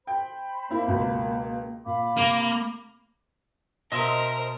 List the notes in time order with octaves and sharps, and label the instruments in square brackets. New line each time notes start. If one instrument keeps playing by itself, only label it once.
[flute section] C5 B5 [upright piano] G5
[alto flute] A#3 [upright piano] C4 E4
[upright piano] C#2 B2
[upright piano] A#2 [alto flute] F5 [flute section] B5 D6
[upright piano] C3 [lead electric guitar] A#3
[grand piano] B2 C6 D#6 [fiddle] A#4 C5 [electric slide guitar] D#5 E5